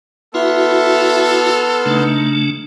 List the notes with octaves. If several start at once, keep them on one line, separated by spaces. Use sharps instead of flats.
B3 E4 F#4 A4 E5 C6 F6
C#3 A3 D4 D#4